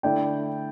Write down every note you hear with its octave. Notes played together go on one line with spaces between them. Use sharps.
D3 A3 E4 D5 G5